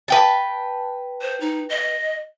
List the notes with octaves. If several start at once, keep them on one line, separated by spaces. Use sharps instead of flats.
B4 G5 A5
C5
D#4
D#5